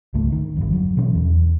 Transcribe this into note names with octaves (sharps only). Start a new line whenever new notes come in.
C#2 G#2 A3
D#3
G1 F2
F#3
B2 E3 C#4
E2